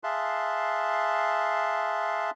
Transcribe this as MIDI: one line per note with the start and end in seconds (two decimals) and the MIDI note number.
0.04 2.31 68
0.04 2.31 76
0.04 2.31 77
0.04 2.31 81
0.04 2.31 84
0.04 2.31 90